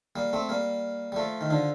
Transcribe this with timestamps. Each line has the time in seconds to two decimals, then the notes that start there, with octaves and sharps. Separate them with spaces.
0.16 G3 A#3
0.33 A3 C4
0.49 G3 A#3
1.12 G3
1.16 F3 A3
1.41 D#3
1.50 D3 F3